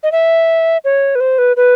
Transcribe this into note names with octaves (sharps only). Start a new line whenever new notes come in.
D#5
E5
C#5
B4
C5
B4
B4